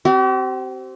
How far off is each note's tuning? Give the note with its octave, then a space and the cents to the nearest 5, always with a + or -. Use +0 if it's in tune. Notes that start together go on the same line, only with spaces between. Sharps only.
C4 +0 G4 -45